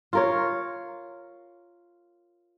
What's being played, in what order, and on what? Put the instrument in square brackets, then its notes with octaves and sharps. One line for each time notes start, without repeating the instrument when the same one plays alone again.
[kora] F4 A#4 C#5